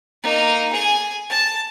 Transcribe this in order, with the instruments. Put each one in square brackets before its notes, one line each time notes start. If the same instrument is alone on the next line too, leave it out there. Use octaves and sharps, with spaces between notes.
[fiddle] A#3 D#4
G#4 G#5
A5